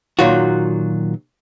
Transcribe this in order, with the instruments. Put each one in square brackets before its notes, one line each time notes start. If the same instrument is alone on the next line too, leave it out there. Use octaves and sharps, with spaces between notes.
[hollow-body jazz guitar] A#2 D#3 F#3 F4 F#4